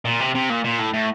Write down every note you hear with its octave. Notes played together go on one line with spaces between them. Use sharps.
A#2
C3
C3
A#2
A#2
A2
A2